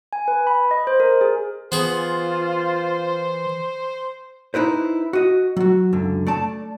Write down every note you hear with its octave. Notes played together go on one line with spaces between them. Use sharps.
G#5
B4
B5
D#5
C5
A#4
G#4
E3 B3 F4 G#4 C5
D#4 E4 B4 C5
F#4 D#5
F#3 F#4
C#2 F#2 D3
A3 D5 A5